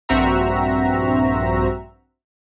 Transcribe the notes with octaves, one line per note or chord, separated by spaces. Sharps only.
A#1 G2 C4 F#4 E5 A#5